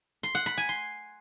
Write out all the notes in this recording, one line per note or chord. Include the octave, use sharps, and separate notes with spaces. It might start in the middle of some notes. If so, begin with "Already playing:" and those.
C6
F#5
B5
G#5
C6